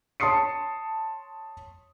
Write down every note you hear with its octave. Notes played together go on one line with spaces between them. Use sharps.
C#5 A5 C6 D#6 C7 C#7